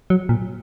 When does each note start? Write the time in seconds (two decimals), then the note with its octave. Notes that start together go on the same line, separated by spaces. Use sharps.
0.10 F#3
0.29 A#2